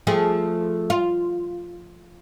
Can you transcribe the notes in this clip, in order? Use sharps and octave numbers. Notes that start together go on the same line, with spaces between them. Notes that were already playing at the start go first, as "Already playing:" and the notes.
F3 A3 G#4
F4